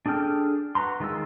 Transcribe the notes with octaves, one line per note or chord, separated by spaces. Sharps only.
D4 G#4 A4 G5 F6
F#4 B4 A#5 C6
D#3 G#3 F4 E6